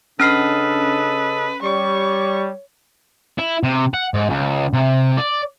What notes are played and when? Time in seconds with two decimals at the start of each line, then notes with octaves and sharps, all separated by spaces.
0.20 C#3 C#4 D4 A4 B4 D#5 F6 C7
1.62 G3 C#5 C#6
3.39 E4
3.63 C3
3.94 F#5
4.14 G#2
4.30 C#2
4.73 C3
5.17 D5